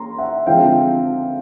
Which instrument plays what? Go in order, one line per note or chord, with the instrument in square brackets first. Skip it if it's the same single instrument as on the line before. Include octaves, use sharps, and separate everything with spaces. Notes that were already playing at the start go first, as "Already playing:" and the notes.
Already playing: [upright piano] A#3 C#4 [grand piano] A#5 C6
[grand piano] E5 F#5
[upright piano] D3 F3 G#3 C4 F4 [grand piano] F5 G5